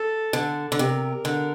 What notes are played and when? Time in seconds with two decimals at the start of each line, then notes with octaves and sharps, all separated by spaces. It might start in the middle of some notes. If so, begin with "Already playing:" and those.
Already playing: A4
0.33 D3
0.72 D3
0.79 C3 A#4
1.25 D3